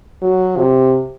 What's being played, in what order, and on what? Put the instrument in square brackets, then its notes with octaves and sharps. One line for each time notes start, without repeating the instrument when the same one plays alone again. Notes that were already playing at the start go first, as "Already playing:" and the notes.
[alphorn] F#3
C3